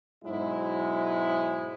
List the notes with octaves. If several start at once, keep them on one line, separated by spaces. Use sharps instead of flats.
B1 G#2 F#3 G#3 E4 C5